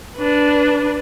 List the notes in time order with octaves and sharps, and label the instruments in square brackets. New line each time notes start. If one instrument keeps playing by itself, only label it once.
[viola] D4 B4